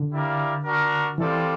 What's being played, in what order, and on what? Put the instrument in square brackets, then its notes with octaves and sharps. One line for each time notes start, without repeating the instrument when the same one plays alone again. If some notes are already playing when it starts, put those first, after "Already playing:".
Already playing: [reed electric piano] D3
[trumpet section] E4 G4 A#4 D5 F5
D4 F#4 A#4
[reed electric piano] E3 [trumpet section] G3 C4 F4 A4 D5